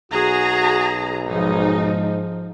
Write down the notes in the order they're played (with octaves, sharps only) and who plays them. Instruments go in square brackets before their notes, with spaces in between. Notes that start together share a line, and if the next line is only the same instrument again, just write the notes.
[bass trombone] B1 [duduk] F#4 [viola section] G#4 A#5
[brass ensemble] G#2 [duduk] F3 [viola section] D#4